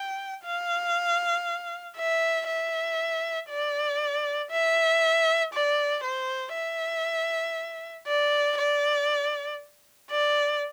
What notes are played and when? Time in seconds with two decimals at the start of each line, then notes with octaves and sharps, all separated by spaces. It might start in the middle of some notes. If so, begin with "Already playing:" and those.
Already playing: G5
0.44 F5
1.97 E5
2.48 E5
3.49 D5
4.51 E5
5.53 D5
6.04 C5
6.54 E5
8.07 D5
8.58 D5
10.11 D5